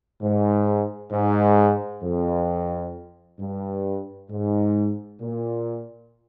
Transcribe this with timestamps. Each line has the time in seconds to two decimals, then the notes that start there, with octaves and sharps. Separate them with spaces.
0.21 G#2
1.12 G#2
2.03 F2
3.40 G2
4.31 G#2
5.21 A#2